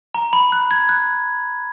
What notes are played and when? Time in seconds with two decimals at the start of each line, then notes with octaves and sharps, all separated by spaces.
0.14 A#5
0.33 B5
0.52 F#6
0.71 G#6
0.89 F#6